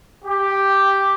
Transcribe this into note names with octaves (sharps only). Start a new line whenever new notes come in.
G4